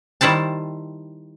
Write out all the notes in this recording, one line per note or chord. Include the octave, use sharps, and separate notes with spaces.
D#3 G3 E4 C5 A5